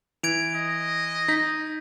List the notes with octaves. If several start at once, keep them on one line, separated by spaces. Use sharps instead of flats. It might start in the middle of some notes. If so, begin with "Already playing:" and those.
E3 G#6 D7 F7
D#5
D#4 G6 A#6 B6